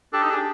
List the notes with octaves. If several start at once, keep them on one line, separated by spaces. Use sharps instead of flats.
D4 G4 A4
D#4
D4 G#4
G4